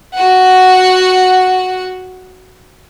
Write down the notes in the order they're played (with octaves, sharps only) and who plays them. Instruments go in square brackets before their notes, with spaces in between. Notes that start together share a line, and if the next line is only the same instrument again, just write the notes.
[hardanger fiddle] F#4 F#5